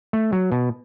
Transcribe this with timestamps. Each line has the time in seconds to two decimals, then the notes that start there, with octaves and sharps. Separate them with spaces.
0.13 A3
0.32 F#3
0.52 B2